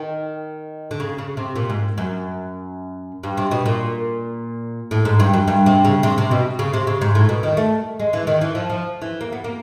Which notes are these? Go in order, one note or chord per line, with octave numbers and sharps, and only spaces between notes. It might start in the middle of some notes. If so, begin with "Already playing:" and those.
Already playing: D#3
D3
C#3
C#3
C3
A#2
G#2
F#2
G2
C3
B2
A#2
A2
G#2
G2
F#2
G2
C3
C#3
C3
C3
B2
C#3
C3
C#3
G#2
A2
B2
D#3
A3
G#3
E3
D#3
E3
F3
F3
E3
A#3
B3
A#3